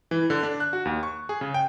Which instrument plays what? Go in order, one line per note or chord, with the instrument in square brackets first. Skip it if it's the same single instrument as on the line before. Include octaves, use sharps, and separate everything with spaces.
[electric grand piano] E3
D3
D4
F#6
F#4
D#2
C#6
G#4
C#3
G5